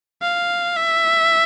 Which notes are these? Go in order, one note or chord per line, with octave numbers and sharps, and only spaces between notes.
F5
E5